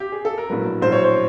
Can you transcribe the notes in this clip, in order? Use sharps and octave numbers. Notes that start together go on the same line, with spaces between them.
G4
G#4
A4
A#4
A#1 A2 F#3 B4
A#1 A2 F#3 C5
C#5
C5